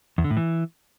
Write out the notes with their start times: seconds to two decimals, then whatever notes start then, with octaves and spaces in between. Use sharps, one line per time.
0.18 E2
0.24 D3
0.31 A2
0.37 E3